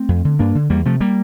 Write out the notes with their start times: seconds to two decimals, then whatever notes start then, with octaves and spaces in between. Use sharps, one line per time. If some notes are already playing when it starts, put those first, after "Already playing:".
Already playing: A3 C4
0.09 F2
0.25 D3
0.39 G2 A#3 D4
0.55 D3
0.70 E2 G3 A#3
0.85 C3 F3 A3
1.01 G3 A#3